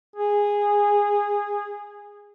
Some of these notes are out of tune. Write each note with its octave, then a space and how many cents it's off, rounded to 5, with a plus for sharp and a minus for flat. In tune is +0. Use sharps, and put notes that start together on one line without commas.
G#4 -15